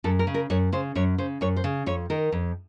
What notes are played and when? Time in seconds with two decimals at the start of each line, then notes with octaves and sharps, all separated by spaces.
0.04 F#2 A4
0.19 A#4
0.27 C#3
0.34 A#4
0.50 F#2 C#5
0.73 C#3 C5
0.95 F#2 C#5
1.18 C#3 C5
1.41 F#2 C#5
1.56 C5
1.64 C#3
1.86 F2 C#5
2.10 D#3 A#4
2.32 F2